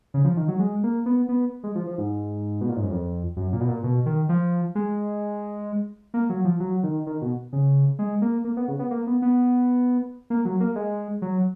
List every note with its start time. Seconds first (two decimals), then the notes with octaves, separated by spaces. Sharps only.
0.14 C#3
0.25 F3
0.37 D#3
0.48 F#3
0.59 G#3
0.83 A#3
1.06 B3
1.29 B3
1.64 G#3
1.75 F3
1.87 F3
1.98 G#2
2.61 B2
2.69 A#2
2.76 G#2
2.83 F#2
2.91 F2
3.37 F#2
3.53 A#2
3.61 B2
3.68 A#2
3.84 B2
4.06 D#3
4.29 F3
4.75 G#3
6.14 A#3
6.29 F#3
6.45 F3
6.60 F#3
6.83 D#3
7.07 D#3
7.22 B2
7.53 C#3
7.99 G#3
8.22 A#3
8.44 A#3
8.57 B3
8.68 C#3
8.79 B3
8.91 A#3
9.07 B3
9.22 B3
10.30 A#3
10.45 F#3
10.60 A#3
10.76 G#3
11.22 F#3